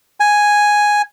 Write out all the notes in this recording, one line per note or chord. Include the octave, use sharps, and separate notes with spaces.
G#5